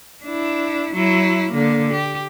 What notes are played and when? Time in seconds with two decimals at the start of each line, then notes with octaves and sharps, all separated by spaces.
0.24 D4 E4
0.94 F#3 E4
1.51 D3 A#3
1.93 G4